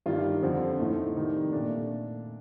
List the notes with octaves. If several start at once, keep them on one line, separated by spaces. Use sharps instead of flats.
G2 D#3 G3 F4
F2 D3 F3
A2 F3 A3 D#4
C3 D#3 G3
A#2 A3 D4